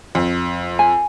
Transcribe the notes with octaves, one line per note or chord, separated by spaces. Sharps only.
F2
G#5